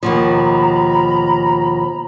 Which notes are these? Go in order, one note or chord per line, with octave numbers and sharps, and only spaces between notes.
D#2 B2 F3 A#5 B5